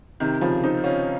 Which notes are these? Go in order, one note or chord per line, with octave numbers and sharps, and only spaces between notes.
C3 D#3
C#3 F3
C4 D#4
C#4 F4